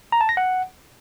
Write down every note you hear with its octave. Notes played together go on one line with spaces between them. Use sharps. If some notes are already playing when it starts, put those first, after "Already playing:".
A#5
A5
A#6
F#5